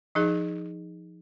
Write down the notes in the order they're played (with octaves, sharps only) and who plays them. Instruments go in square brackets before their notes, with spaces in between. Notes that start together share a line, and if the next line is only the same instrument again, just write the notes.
[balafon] F3 D#4 G#4